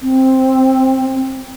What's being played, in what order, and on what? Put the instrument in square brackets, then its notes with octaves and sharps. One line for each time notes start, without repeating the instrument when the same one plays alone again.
[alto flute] C4